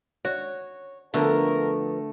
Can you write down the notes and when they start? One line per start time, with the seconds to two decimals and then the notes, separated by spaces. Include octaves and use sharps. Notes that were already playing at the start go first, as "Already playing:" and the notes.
0.25 F#4 C#5
1.14 D3 F3 A3 B3 A#4